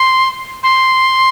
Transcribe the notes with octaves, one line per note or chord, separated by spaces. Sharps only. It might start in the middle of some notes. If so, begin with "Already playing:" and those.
Already playing: C6
C6